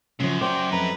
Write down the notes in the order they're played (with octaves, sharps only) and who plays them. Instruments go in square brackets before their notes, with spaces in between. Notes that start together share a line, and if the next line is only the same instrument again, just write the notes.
[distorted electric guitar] F#2 [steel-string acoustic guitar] C#3 F3
[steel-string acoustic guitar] C5 [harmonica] D5 G5
[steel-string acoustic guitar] F2 [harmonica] B4 A#5